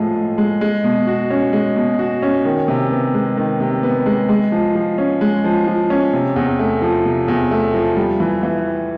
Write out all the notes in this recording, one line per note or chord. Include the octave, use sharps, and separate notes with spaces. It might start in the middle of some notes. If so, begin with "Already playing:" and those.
Already playing: A2 F3 G#3
A2
G#3
G#3
B2
F#4
C#4
G#3
B2
F#4
C#4
D#3
C3
B3
G#3
D#3
C3
B3
G#3
G#3
F3
F3
C#4
G#3
F3
F3
C#4
C3
E2
A3
F3
C3
E2
A3
F3
G3
E3
E3